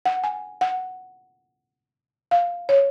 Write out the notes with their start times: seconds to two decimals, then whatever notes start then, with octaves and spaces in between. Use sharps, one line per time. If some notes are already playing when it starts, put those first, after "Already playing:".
0.06 F#5
0.23 G#5
0.61 F#5
2.31 F5
2.69 C#5